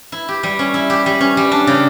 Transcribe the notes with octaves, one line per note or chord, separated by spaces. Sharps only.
E4
G4
G3
C#4
E4
G4
G3
C#4
G3
D4
C#3